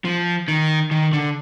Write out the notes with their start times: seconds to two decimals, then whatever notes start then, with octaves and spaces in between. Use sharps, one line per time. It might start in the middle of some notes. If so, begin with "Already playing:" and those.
0.05 F3
0.48 D#3
0.91 D#3
1.13 D3